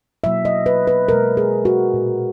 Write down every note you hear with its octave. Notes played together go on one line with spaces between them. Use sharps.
B2 F#3 A#3 E5
D#5
B4
B4
B2 G#3 A#4
G#4
F#4
A#2 G#3